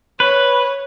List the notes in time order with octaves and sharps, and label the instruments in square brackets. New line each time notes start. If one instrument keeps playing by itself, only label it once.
[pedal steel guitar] B4 [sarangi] C#5